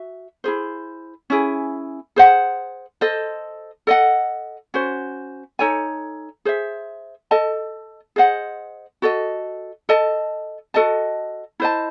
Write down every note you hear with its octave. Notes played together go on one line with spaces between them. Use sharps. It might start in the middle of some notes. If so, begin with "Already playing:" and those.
Already playing: F#4 E5
E4 G#4 C5
C#4 E4 G#4
G#4 C5 F#5
A4 C5 D#5
A4 D#5 F#5
C#4 F#4 C5
D#4 A4 C#5 G#5
G#4 C5 E5
A4 D#5 A5
G#4 C5 D#5 F#5
F#4 A4 D#5
A4 D#5 A5
F#4 A4 D#5 A5
E4 C5 D#5 A5